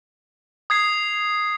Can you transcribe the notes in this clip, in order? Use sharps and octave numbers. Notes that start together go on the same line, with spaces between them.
D#6 G#6 C7